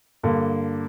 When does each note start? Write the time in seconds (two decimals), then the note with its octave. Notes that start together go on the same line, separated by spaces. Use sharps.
0.23 G2 D3 A#3